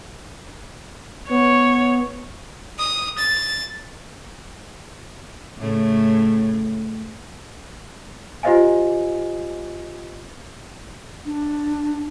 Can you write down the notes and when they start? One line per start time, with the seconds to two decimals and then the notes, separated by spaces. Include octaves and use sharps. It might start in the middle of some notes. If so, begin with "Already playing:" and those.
1.30 B3 C#5
2.79 D#6
3.18 A6
5.58 A2 C#3 A3
8.43 F4 G4 C5 D#5 F5 G#5
11.25 D4